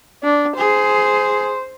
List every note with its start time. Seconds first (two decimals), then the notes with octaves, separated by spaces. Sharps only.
0.24 D4
0.57 G#4 C5